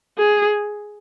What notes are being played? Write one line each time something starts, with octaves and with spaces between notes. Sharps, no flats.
G#4